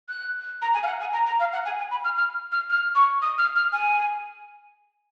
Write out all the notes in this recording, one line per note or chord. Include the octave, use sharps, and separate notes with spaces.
F#6
A#5
G#5
F5
F#5
G#5
A#5
A#5
F5
F#5
G#5
G#5
B5
F6
F6
F6
F6
C#6
D#6
F6
F6
G#5